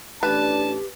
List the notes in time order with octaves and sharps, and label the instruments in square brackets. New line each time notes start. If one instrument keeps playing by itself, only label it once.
[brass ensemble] A1 D4 [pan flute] G4 [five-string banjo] B4 [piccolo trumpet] A5